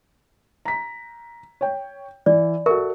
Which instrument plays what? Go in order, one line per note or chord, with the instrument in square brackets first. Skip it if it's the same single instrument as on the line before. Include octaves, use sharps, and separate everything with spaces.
[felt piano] A#5 B6
C#5 G5
[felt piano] E3 [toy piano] D5
[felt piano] F#4 A4 C#6 [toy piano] A#4 E5